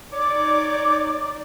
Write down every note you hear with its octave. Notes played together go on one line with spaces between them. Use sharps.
D#4 C#5 D5 D6